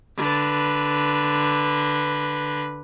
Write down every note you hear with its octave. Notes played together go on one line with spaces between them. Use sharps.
D3 B4